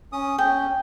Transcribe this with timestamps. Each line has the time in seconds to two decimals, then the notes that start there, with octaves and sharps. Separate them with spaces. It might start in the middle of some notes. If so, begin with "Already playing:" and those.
0.12 C#4 D#6
0.38 C#4 G5